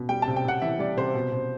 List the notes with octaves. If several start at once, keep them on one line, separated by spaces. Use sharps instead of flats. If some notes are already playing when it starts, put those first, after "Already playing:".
Already playing: B2
G3 G5
A5
C3
G5
C3 F#5
E3 E5
G3 D5
C3 C5
B2
B2